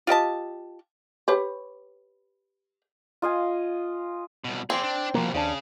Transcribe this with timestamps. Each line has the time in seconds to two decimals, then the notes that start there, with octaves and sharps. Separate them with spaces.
0.07 F4 G4 D#5 A5
1.28 G4 B4 C#5
3.22 F4 D#5 F5 G#5
4.44 C2 B2
4.70 C4 G#4 D5
4.84 D4
5.14 C2 B2 F3 A#3
5.34 D#2 C#3 C#4 D4